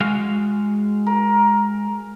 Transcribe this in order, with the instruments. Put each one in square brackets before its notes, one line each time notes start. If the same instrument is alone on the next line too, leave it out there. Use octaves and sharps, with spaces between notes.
[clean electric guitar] G#3 F#4 F5
[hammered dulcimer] A#4